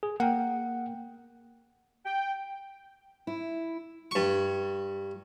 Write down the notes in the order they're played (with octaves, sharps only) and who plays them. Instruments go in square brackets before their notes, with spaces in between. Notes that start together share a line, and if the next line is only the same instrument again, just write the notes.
[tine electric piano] G#4
[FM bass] A#3 [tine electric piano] F#5 G5
[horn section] G5
[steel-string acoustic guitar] E4
[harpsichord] G2 C#6